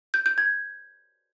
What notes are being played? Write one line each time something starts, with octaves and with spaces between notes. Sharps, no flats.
G6
G6
G#6